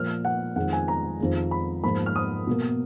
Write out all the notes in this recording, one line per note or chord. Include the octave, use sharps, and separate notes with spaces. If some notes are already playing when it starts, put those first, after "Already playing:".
Already playing: A#2 F3 A#3 F6
F#5
F2 D#3 G#3 F#5
G#5
A#5
F2 D#3 G#3
B5
G#2 F3 A#3 B5
F6
D#6
B2 A#3